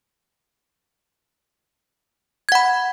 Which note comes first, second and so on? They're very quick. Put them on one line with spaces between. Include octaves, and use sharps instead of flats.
G#6 F#5 B5